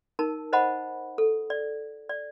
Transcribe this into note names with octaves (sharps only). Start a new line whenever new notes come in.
D#4 A#4 A5
C5 D#5 F#5 A5 B5
A4
D5
D5